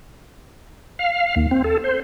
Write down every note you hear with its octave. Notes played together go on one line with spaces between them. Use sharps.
F5
D#2
C4
A4
C5